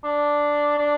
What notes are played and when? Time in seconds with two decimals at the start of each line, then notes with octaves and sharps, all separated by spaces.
0.04 D4
0.78 D4